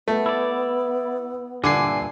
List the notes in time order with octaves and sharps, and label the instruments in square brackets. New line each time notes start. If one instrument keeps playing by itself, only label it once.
[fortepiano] A3 [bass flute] B3
[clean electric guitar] E4 D5
[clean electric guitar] G2 A#2 E3 [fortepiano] D3 [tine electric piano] D5 G#5 C7